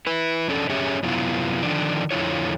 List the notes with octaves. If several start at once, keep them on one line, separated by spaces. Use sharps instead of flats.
E4 B4
F2 C#4 D4 A4 D5
F#2 C#4 G4 G#4 C#5 E5
F#2 C3 F#3 B3 E4 F4
D3 D#3 F3 D4
F2 D3 E4 F4 C#5